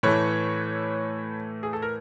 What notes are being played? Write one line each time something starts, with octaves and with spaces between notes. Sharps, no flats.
A2 E3 A3 B4 C#5
G#4
A4
A#4